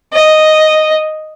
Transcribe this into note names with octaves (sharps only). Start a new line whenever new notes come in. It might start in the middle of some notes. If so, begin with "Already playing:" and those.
D#5